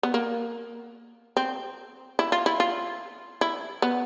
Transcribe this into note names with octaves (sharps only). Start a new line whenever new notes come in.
B3
A#3
C4
E4
F4
E4
F4
E4
B3